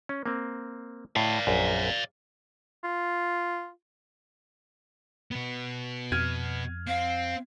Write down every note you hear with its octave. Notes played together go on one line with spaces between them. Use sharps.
C#4
A#3 C4
A2 D5 F5
A#1 F#2 A#5
F4
B2 B3
F2 F6 G#6 D#7
C4 F5